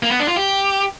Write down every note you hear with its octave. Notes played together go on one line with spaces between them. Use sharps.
A#3
B3
D4
F4
G4